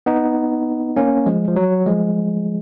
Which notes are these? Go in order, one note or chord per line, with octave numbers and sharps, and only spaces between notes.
B3 D#4
A#3 C#4
F3 G#3
F3
F#3
F3 G#3